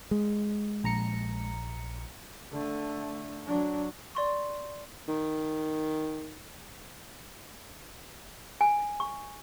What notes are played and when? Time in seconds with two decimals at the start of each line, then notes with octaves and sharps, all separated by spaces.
0.11 G#3
0.84 A#1 A#5 C#7
2.51 D3 A3
3.46 F#3 D4
4.15 D5 C6 C#6
5.08 D#3
8.61 G#5
9.00 C#6